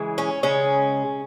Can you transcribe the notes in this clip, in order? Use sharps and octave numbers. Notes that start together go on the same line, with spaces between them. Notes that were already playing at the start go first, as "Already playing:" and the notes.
Already playing: C#3 E3 G#3
C#4
C#3 G#3 C#4